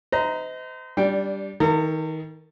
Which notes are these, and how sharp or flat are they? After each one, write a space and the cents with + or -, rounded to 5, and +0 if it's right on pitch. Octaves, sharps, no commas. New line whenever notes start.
C5 -40 D#5 +25 A#5 +0
G3 +0 D4 -20 G5 +0
D#3 +30 A#4 -45 A#5 -40